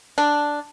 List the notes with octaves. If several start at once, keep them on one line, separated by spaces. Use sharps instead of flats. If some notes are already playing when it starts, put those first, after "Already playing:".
D4